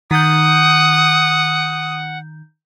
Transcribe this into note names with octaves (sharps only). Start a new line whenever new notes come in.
D#3 F#5 D#6 G6